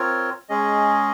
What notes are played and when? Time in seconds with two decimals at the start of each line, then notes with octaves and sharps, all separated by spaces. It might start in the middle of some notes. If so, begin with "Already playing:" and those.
Already playing: C4 F4 A#4 C#5
0.49 G#3 C#4 G#4 D#5